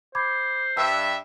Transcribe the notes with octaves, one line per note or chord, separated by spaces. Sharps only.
C5 B5 D6 G#6
G2 E5 G5 E6